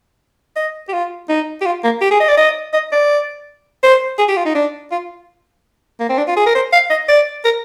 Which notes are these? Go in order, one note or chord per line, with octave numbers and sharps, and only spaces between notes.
D#5
G4
F4
D#4
G4
F4
A#3
G4
G#4
D#5
D5
D#5
D#5
D5
C5
G#4
G4
F4
D#4
D4
F4
A#3
C4
D4
F4
G#4
A#4
C5
F5
D#5
D5
A#4